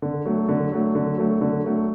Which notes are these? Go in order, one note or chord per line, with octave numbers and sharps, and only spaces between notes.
D3
F#3 A3
D3
F#3 A3
D3
F#3 A3
D3
F#3 A3